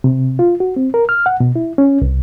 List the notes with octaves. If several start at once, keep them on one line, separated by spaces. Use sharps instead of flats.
C3
F4
F#4
C4
A#4
F6
F#5
B2
E4
C#4
C2